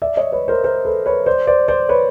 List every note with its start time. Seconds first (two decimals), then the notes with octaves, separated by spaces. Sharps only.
0.02 D5 E5
0.17 C#5 D#5
0.32 B4 C#5
0.48 A#4 C5
0.64 A#4 C5
0.85 A4 B4
1.06 B4 C#5
1.26 C5 D5
1.47 C5 D5
1.68 C5 D5
1.89 B4 C#5